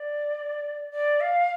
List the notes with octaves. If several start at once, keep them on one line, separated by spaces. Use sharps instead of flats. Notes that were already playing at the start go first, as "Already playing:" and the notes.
Already playing: D5
D5
F5